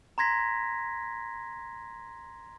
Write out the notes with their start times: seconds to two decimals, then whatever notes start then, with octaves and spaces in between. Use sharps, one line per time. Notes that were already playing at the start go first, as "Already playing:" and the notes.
0.18 A#5 C6 G#6 A#6 B6